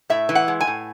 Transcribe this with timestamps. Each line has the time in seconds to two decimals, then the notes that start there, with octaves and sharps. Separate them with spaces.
0.10 A2 E5
0.29 E3
0.35 F#5
0.48 G#3
0.61 G#5
0.67 A2